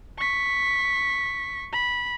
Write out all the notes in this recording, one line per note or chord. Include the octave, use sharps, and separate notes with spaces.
C#6 B6
B5